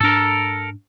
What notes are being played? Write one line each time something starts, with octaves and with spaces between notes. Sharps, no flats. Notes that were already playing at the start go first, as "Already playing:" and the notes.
G#2 D4 A4 A#4